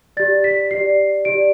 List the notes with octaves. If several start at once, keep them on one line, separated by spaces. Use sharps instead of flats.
G4 D5 A6
B6
G4 D5 C7
G4 D5 D7